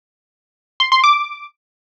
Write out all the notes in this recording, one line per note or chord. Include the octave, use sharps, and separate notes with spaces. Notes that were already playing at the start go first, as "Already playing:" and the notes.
C6
C6
D6